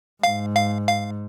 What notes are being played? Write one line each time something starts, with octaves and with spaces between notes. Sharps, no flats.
G#2 F5
F5
F5